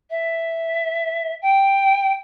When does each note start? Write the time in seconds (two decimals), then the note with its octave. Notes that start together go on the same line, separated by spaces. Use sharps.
0.10 E5
1.42 G5